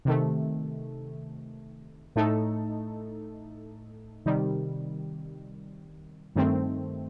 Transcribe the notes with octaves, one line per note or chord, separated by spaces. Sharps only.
C3 D#3 A3
A2 A3 D#4 A4
C3 D#3 G3
G2 D#3 A3 C4